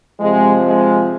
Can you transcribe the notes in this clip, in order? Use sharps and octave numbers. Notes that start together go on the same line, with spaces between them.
C3 F3 G#3
G#3